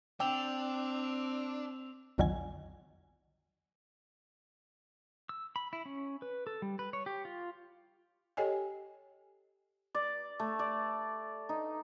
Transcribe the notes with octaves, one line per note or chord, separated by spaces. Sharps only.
C4 D4 G5 D6 E6 F7
B1 F2 D3 D#3 F#3 G#5
E6
B5
E4
C#4
B4
A4
G3
B4
C#5
G4
F4
G4 A4 C#5 D#5 G5 G#5
D5
A3
D5
D#4